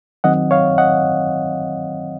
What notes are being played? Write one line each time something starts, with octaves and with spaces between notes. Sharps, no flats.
D#3 F#3 C4 D#5 F#5
C#5 F5
D#5 F#5